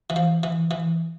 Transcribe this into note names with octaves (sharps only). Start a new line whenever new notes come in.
E3
F3
E3
E3